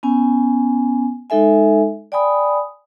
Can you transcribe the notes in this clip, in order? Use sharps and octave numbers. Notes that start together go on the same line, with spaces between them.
B3 C#4 G#5
G#3 D#4 A4 E5 G#5
D5 G5 G#5 B5 D#6